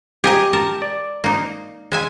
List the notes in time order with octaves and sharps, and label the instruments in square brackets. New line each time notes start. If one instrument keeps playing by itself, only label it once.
[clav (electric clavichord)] G4 [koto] G#4 A#4 D#5
[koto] A#4 A5
[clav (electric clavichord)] D5
[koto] A#3 D#4
G#3 E5 G#5